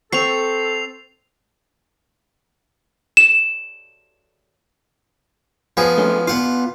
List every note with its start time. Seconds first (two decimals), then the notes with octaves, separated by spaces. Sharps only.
0.12 C4 A4 C#6 C7 F7
3.17 E7
5.77 F3 B3 G#4
5.98 A3 C#4 F4
6.27 B3 F4 F5 F#5